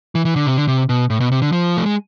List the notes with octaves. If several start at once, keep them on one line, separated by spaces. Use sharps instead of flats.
E3
E3
D3
C3
D3
C3
B2
A2
B2
C3
D3
F3
A3
G#3